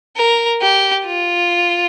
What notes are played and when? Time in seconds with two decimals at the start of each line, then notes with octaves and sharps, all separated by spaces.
0.17 A#4
0.61 G4
1.06 F4